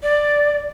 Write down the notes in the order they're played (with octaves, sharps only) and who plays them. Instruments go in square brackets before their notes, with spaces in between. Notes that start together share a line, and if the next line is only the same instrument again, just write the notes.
[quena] D5